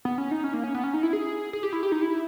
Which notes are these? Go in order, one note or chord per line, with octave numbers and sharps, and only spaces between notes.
B3
C#4
D#4
C#4
A#3
C#4
B3
C#4
D#4
E4
G#4
G#4
G4
E4
G4
D#4
E4